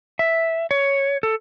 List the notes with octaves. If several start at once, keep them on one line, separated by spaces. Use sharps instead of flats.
E5
C#5
A4